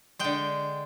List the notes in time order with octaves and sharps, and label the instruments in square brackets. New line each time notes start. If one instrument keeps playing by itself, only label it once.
[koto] D3 G#3 G5